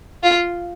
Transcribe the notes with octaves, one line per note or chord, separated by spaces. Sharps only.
F4